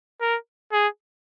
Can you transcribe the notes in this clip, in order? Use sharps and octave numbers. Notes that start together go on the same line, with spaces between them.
A#4
G#4